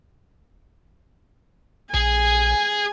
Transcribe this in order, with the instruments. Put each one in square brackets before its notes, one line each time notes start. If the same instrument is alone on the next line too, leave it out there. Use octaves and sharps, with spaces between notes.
[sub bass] A#1 [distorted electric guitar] G#4 [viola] G#5